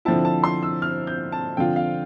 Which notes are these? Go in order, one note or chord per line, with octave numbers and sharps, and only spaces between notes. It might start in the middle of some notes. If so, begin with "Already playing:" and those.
D3 F3 C4 E4 A5
A5
C6
E6
F6
G6
A5
D3 F3 C4 F4 G5
F5